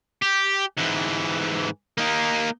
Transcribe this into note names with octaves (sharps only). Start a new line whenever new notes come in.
G4
G#2 E3
A#3 D#4